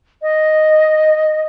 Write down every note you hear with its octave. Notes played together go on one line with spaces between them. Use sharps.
D#5